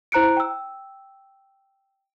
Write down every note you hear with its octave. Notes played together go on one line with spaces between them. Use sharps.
E4 C5 A#5 F#6 C#7 D7
G5 E6